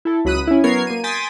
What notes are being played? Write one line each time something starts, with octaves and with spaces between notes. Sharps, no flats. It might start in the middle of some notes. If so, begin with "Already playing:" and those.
E4 A4
C#2 F#3 B5 D#6 F#6 D#7
C#4 E4
F#3 B3 A#4 C#5 G#6 C7
A#3 D#7
G5 G#5 C6 D#6 A6 B6